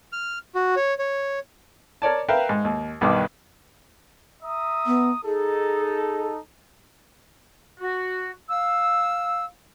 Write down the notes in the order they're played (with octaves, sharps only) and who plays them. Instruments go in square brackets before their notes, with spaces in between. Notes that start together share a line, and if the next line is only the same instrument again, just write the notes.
[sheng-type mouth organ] F6
F#4
C#5
C#5
[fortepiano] A#4 C#5 D5 A5
A#4 B4 E5 F5 G5
G#2
D#2
B1 G2 D#3 B4 D6
[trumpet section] E5 A#5 D#6
[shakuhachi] B3
[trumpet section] D#4 A4 [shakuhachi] G#4
[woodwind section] F#4
F5 E6